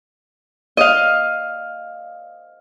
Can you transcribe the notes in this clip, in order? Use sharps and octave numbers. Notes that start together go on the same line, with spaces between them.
D#5 F5